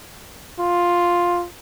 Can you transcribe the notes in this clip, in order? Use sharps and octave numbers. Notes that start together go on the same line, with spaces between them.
F4